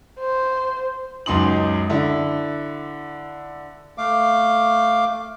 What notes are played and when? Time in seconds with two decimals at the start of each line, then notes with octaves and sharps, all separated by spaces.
0.19 C5
1.26 C#2 F#2 D#4 C6 D#6 F#7
1.90 D3 E4
3.98 A3 F5 D6